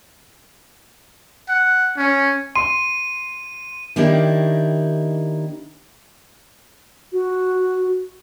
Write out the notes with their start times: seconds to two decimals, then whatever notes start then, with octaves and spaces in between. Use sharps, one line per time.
1.49 F#5
1.97 C#4
2.56 C6 D#7
3.96 D#3 A#3 D4 E4 G4
7.13 F#4